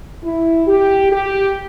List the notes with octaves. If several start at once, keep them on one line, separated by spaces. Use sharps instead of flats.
E4
G4
G4